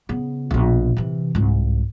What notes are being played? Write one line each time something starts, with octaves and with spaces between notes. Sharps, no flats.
C#3 B3
A#1 B2
C3 E3
C2 G#2